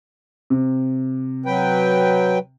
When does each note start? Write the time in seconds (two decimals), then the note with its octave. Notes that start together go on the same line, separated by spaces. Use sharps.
0.50 C3
1.46 F#3 B4 G5